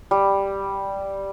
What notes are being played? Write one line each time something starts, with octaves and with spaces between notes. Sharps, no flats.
G3